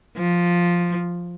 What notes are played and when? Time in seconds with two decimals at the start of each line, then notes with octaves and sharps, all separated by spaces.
0.17 F3